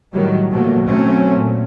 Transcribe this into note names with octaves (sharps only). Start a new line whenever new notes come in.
A2 D#3 F#3 G3
G#2 B2 F3 F#3 A3 A#3
F#3 A3 C4 C#4
A#2